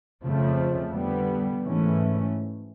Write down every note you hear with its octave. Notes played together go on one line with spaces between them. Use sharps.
F2 C#3 F3 A3
D3 G3 B3
G#2 E3 A3 C#4